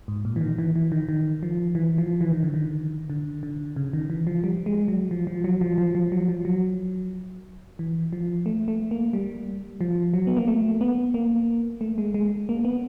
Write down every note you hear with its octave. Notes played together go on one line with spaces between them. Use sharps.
G#2
A#2
E3
D#3
E3
E3
D#3
D#3
F3
E3
F3
E3
D#3
D3
D#3
D3
D3
C#3
D#3
E3
F3
G3
G#3
F#3
F3
F3
F#3
F3
F3
F3
F#3
F3
F#3
E3
F3
A3
A3
A#3
G3
F3
F#3
B3
A#3
A3
B3
A#3
A3
G#3
G#3
A#3
A#3
B3